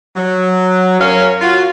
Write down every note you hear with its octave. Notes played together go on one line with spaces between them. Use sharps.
F#3
F#2 C#4 A#4 C#5 F5
F4 F#4